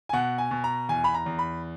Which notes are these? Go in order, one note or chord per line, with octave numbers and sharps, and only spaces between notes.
G#5
B2 F#5
G#5
B2
A#5
E2 G#5
B5
A#5
E2
B5